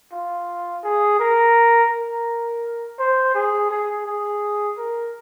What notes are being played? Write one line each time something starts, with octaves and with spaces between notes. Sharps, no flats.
F4
G#4
A#4
A#4
C5
G#4
G#4
G#4
A#4